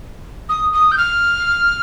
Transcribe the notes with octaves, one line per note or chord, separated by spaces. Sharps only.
D#6
D#6
G6
F6